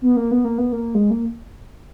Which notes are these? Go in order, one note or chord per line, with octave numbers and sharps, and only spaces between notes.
B3
A#3
B3
A#3
B3
A#3
G#3
A#3